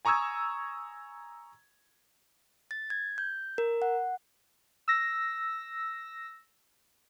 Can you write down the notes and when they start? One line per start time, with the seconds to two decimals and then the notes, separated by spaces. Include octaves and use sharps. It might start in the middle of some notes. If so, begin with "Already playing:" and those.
0.05 G#5 A#5 C#6 D#6 E6 G#6
2.71 A6
2.90 G#6
3.18 G6
3.58 A#4
3.82 F#5
4.88 E6 A#6